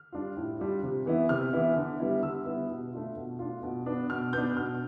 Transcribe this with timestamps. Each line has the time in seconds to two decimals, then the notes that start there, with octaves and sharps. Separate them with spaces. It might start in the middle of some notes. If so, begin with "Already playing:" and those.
Already playing: F6
0.12 G3 D4 F4
0.37 A2
0.60 G3 D4 F4
0.83 C3
1.06 E3 B3 E4
1.29 C3 F6
1.53 E3 B3 E4
1.76 D3
2.00 G3 B3 E4
2.23 D3 E6
2.46 G3 B3 E4
2.70 B2
2.93 A3 D4 F4
3.16 B2
3.39 A3 D4 F4
3.63 B2
3.86 B3 D4
4.10 B2 F6
4.33 B3 D4 G6
4.56 B2 F6